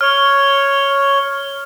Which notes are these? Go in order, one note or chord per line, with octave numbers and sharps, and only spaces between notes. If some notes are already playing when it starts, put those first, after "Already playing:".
C#5 F6